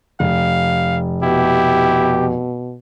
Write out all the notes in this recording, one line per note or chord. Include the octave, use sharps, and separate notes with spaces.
F1 F5
B2 E4 G4